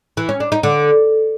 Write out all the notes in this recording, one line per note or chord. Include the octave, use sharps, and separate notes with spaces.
E3
C#4
D4
D#4
D3